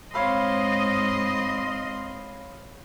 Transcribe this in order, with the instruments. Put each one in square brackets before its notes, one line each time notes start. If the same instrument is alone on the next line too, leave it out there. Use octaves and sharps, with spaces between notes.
[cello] G#2 D#5 [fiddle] C4 C6 [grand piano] C#5 F5 B5